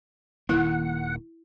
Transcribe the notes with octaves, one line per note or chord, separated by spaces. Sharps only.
D#1 D#3 A#3 E4 F#5